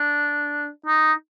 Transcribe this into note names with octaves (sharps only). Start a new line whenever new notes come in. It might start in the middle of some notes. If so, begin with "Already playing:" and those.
Already playing: D4
D#4